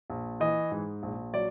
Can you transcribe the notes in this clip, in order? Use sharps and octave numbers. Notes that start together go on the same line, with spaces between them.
A#1
E3 D#5
G#2
A#1
F#3 D5